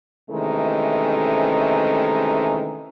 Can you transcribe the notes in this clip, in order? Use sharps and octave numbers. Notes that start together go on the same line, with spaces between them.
C3 D#3 E3 G#3 A3 C#4